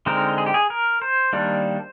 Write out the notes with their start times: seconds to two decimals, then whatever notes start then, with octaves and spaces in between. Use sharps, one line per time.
0.06 D3 G#3 C4 D#4 A#4
0.38 G#4
0.46 G4
0.54 G#4
0.70 A#4
1.02 C5
1.33 D#3 G3 A#3 D4